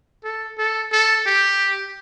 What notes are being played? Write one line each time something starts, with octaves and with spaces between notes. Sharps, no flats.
A4
A4
A4
G4